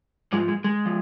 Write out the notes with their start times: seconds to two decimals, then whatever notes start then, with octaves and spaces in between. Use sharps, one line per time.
0.32 G#2 F3 G#3
0.48 G#3
0.64 G#3
0.85 F3